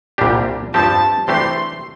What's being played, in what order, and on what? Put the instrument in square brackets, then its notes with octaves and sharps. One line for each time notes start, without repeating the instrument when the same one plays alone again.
[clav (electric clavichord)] C2 A#2 G3 D4 G4
[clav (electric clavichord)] G2 F3 C4 G4 [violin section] A5
[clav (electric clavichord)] C3 E3 A3 D4 G4 [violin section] C6